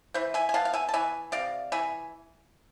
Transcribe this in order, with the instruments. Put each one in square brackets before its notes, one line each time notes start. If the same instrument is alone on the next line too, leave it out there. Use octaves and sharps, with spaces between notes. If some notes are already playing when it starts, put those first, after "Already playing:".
[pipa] E3 C5 E5
E5 G#5
G#5
B3 F5 A5
F5
E5 G#5
A5
E3 E5 G#5
C3 D5 F5
E3 E5 G#5